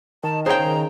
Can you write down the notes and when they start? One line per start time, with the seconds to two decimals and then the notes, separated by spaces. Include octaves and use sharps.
0.23 D#3 A5
0.46 C#3 G#4 C5 G5 A#5